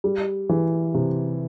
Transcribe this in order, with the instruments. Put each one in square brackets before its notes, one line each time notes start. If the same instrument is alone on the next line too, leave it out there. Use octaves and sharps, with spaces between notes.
[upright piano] G3
E3
C3